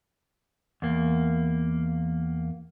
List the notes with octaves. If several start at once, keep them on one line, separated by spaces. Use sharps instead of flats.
E2 A#3